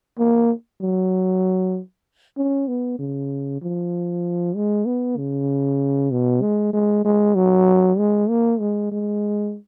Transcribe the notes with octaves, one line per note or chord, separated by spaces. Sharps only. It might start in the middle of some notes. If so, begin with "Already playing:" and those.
A#3
F#3
C#4
B3
C#3
F3
G#3
B3
C#3
B2
G#3
G#3
G#3
F#3
G#3
A#3
G#3
G#3